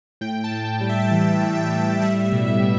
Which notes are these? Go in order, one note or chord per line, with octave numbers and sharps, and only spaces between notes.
A2 G5
A5
A2
G5
G3
E5
A5
E3 G5
A2
G5
A2
G3 E5
E5
B2
E5
B2